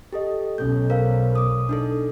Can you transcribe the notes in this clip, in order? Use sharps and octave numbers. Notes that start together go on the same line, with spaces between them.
G4 A4 D#5
B1 C#4 A4 G6
A#4 C5 F5
D6 D#6
D4 D#4 A4